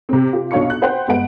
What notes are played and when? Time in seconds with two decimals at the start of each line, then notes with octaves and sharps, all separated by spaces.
0.09 C3 C4
0.33 F4 G4
0.51 B1 D4 C#5 F5 C#6 C#7
0.70 F#6
0.82 B4 C5 F#5 G5 C6
1.08 G1 G#3 B4 F#5 D7